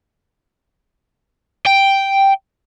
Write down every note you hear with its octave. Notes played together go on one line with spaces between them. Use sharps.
G5